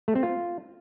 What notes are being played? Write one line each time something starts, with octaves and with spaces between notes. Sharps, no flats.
A3
C4
F4